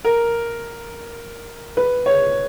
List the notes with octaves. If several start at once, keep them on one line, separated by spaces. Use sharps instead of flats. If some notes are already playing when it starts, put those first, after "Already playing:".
A#4
B4
C#5